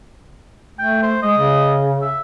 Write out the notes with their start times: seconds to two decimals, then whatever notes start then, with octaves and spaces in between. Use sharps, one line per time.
0.79 A3 G5
1.02 C5
1.22 G#3 D#5
1.38 C#3
2.02 E5